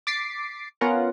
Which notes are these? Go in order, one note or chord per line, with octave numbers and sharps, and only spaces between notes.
D6 A6 B6 C7 D7
B3 C#4 F4 A#4 F#5 A#5